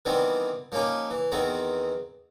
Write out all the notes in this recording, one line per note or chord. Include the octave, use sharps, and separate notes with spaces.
D#3 E3 G3 B3 C4
F3 A#3 C#4 D#4 G4
E3
E2 D#3 B3 C4 A#5